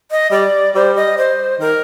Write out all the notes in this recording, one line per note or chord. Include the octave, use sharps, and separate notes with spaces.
D#5
G3 D5
G3 C5
D#5
C5
D#3 A#4